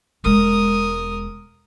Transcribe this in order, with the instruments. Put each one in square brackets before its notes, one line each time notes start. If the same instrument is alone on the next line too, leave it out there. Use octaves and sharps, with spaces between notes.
[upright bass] E1 G#3 [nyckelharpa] A#4 D#6